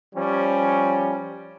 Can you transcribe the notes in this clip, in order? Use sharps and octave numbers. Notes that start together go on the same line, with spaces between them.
F3 G3 C#4